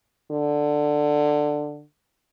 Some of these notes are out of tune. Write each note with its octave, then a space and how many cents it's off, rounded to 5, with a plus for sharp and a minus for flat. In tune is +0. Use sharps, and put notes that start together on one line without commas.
D3 +10